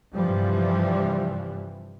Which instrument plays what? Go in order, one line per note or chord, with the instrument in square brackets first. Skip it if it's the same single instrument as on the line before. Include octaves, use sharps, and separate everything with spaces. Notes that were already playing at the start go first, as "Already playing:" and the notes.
[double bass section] G2 C3 E3 F3 G3